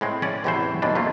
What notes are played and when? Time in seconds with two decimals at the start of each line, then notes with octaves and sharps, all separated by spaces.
0.01 A2 G#3 C4
0.22 C#4 D5
0.44 E2 A2 C3 E3 F#4 C5
0.82 D#2 B2 D#3 E3 G3 D4
0.95 C3 A3 A#3 F4